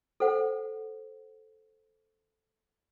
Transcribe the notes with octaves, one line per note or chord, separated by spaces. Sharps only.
A4 C5 F#5